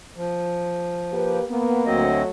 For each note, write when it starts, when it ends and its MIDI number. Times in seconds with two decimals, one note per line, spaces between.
0.16 1.39 53
1.12 1.44 58
1.12 1.44 67
1.12 1.44 71
1.49 2.08 58
1.49 1.85 59
1.86 2.22 38
1.86 2.30 54
1.86 2.30 57
1.86 2.22 60
1.86 2.22 75